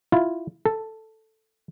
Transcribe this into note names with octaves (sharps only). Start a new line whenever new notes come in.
E4 F4
A4